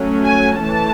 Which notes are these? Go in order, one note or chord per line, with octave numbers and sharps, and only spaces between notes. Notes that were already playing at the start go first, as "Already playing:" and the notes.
Already playing: F#3 A3 C#4
G#5
E3 A3 A5